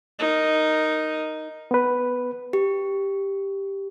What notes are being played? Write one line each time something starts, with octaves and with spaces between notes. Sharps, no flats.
D#4 A#4
B3 B4
G4